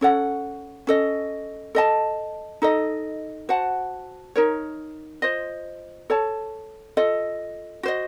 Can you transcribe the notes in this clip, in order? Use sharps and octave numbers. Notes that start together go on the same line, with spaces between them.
C#4 A4 C#5 F#5
C#4 A4 D#5
A4 D#5 A5
D#4 A4 D#5
F#4 C5 F#5 A5
D#4 A#4 C#5
F4 C5 D#5
A4 C#5 A5
F4 A4 D#5
F#4 C5 D#5